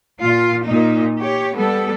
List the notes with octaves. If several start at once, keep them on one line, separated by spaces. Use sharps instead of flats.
A#2 F4
A#2 D#4
G4 C#5
G3 B3 A4